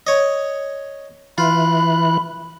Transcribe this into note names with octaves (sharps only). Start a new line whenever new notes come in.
C#5 D#5
E3 F4 B5 F#6